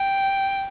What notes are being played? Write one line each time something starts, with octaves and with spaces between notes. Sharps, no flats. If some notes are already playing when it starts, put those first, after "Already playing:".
Already playing: G5